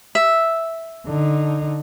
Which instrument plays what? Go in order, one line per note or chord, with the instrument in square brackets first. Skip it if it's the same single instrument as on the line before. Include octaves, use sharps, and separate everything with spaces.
[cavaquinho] E5
[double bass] D3 D#4